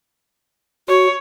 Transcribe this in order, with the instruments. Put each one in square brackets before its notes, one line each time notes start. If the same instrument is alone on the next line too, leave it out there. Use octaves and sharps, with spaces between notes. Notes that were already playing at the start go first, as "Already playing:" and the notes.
[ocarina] F#4 [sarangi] C#5